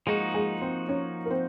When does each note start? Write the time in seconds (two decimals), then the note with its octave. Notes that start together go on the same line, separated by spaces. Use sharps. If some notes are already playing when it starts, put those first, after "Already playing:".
0.06 F3 G#3 A#3 D#4 F#4 G#4
0.34 G#3 G#4
0.62 C4 C5
0.89 C#4 C#5
1.26 A#4
1.30 C4 C5